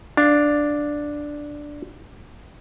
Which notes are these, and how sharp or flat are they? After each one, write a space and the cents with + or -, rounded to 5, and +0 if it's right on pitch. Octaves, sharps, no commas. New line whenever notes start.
D4 +0 F5 +0